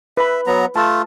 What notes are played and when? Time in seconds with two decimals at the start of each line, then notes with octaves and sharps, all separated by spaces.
0.17 B4 E5 B5
0.47 F#3 B3 A#5
0.76 A3 F4 A5